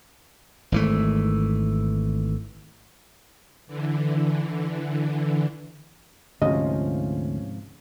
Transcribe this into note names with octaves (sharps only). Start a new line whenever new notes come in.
G#1 E3 A3
D3 E3
D2 G#2 C3 F3 C#4 F4 D#5